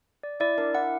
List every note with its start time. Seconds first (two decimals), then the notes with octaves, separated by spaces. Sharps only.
0.23 D5
0.40 E4 D5
0.58 D4 A#4
0.74 E4 F#5